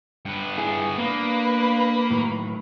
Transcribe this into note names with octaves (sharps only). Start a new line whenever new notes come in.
G2 B3
E4 G#4
A#3 B3 D4 B4
A2 D#3 F#3